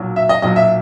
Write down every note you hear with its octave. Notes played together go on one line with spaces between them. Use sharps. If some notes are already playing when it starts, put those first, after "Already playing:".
Already playing: B1 A#2 F#3
E5
D#5
B1 A#2 F#3 D#5
E5